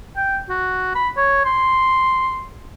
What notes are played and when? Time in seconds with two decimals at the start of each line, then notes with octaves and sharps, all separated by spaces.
0.17 G5
0.49 F#4
0.95 B5
1.17 C#5
1.45 C6